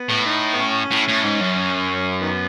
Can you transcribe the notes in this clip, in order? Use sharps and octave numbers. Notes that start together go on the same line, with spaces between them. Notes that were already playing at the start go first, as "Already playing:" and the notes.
Already playing: B3
A2
D#4
B3
C#4
A2
A2
G#2
F#2
D#3 B3